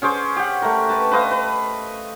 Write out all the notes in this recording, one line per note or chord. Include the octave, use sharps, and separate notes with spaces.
C#4 G#4 C5 D6
G4 F#5
A3 A#4
B4 A5
B4 C5 D#5 F5
B4